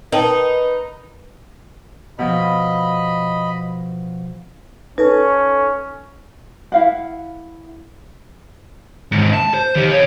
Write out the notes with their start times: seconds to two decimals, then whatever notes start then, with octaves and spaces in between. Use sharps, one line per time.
0.12 D#4 A#4 B4 G5 A5
2.19 B2 F3 D#5 B5
4.98 C#4 D#4 A4 B4
6.72 E4 F5 F#5
9.12 D#2 G#2
9.33 A5
9.54 C5
9.76 D#3 G4
9.91 B2 C#5